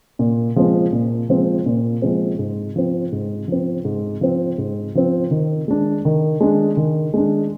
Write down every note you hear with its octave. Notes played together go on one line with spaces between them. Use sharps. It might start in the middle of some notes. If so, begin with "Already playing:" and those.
A#2
F3 G#3 C4
A#2
F3 G#3 C4
A#2
F3 G#3 C4
G#2
F3 C4
G#2
F3 C4
G#2
F3 C4
G#2
F3 C4
D#3
G#3 D4
D#3
G#3 D4
D#3
G#3 D4